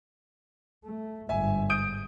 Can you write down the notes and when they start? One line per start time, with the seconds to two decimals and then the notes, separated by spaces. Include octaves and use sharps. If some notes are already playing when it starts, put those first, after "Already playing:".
0.84 A3
1.29 G1 G#2 E5 G#5
1.70 D#6 G6 D7